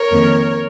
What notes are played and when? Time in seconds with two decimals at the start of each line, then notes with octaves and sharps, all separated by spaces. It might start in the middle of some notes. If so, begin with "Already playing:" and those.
Already playing: A#4 C#5
0.11 F2 D#3 A#3